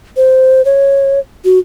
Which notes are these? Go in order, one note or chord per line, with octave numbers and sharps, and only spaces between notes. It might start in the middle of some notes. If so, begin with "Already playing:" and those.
C5
C#5
F#4